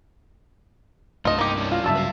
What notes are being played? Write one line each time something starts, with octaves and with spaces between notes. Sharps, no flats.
C2 G2 A3 F4 D#5
A#3 D#4 G4
C#4 D4 E4
F4
G2 C#3 F#3 E5 A5 E6
B4 F5